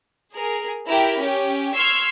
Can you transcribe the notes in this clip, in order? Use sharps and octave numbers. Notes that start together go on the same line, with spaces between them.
G#4 A#4
E4 G4 A#4 B5
C#4 G4
C6 C#6 E6 F6 G#6 C7